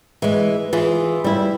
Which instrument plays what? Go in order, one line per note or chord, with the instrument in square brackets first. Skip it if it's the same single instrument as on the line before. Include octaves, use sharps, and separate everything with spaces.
[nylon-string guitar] E3 G#3
E3 F4 G#4
G3 E4